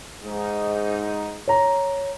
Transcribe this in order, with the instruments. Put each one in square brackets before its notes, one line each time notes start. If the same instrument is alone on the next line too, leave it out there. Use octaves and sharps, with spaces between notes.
[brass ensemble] G#2 D#4
[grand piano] C#5 A#5